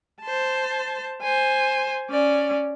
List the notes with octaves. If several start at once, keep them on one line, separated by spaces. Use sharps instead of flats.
C5 A5
C5 G#5
C#4 D5